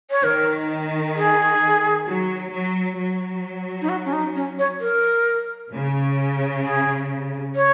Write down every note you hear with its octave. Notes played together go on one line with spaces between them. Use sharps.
C#5
D#3 A#4
G#4
F#3
F#3
F#3
D#4
F#4
C#4
D#4
C#4
C#5
A#4
C#3
G#4
C#5